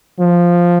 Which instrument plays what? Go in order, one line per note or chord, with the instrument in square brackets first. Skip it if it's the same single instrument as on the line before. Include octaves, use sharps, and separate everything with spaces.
[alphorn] F3